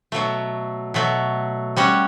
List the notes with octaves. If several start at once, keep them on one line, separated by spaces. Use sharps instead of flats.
B2 F#3 A3
B2 F#3 A3
G3 C#4 F#4